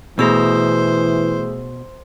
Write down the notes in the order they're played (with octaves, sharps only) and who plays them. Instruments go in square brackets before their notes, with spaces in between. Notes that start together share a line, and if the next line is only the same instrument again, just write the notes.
[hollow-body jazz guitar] B2 [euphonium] E3 [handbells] A3 G#4 E6 [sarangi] C5